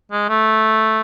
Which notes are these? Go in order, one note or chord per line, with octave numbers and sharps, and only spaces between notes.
G#3
A3